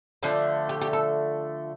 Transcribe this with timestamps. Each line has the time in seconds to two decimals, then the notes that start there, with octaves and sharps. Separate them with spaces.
0.23 D3 F3 A3 D4
0.69 G4
0.81 G4
0.93 A4